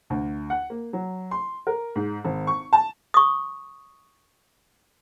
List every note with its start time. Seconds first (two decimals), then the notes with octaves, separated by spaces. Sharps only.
0.10 D2
0.50 F#5
0.70 A#3
0.93 F#3
1.31 C6
1.67 A#4
1.96 G#2
2.25 G#1
2.47 C#6
2.73 A5
3.14 C#6 D#6